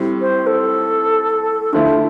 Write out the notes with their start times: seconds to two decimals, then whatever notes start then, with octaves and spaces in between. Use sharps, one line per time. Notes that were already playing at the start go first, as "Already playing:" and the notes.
Already playing: A2 G3 C4
0.21 C5
0.47 A4
1.73 D3 F3 A3 E4 F4